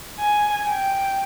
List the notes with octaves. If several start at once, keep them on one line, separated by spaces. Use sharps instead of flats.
G#5
G5